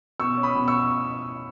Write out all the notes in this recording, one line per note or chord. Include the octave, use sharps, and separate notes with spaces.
B2 C#6 E6
C#4
B5 D#6
B2
C#6 E6